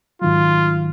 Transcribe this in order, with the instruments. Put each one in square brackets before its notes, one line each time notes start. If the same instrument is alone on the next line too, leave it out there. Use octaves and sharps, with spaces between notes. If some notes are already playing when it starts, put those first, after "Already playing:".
[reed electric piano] G#2 D#3 F#3 [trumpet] F4